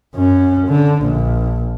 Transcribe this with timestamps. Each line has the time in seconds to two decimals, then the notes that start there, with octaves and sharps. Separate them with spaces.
0.15 F#2 C#4
0.67 D3
1.02 A#1